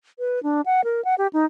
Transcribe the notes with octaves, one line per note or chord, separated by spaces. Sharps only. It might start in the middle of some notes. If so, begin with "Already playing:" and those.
B4
D4
F#5
A#4
F#5
G4
D#4